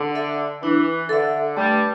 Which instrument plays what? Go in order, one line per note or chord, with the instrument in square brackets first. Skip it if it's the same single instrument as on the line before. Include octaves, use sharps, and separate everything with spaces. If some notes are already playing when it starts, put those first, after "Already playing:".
Already playing: [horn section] D3
[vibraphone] A4 E5
[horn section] E3 [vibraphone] D4
[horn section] D3 [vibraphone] A4 E5
[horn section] G2 G3 [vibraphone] A3